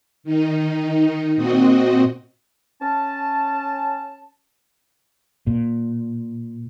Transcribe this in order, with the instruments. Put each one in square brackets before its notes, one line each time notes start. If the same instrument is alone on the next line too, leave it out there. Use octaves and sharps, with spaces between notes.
[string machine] D#3 D#4
A#2 C4 F#4 D#5
[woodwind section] C#4 A5
[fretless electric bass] A#2